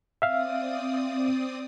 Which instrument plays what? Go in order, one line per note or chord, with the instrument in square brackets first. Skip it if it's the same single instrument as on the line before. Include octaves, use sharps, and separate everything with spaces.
[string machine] C4 D5 D#6 [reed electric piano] E5 F5